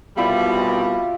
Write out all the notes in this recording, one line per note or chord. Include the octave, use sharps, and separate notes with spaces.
C2 B2 G3 E4 F4 E5